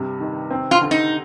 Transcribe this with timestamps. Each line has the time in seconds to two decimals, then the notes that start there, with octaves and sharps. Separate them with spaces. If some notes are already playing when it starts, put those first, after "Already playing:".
Already playing: G2 C3
0.20 D#3
0.51 C4
0.71 F4
0.81 D3
0.91 D#4